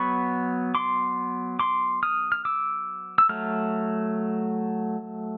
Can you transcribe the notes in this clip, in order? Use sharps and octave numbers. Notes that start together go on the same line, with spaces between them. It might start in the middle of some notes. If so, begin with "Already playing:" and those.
Already playing: F#3 B3 B5 C#6
C6 D6
C6 D6
D#6 F6
F6
D6 E6
E6
F#3 A3 F6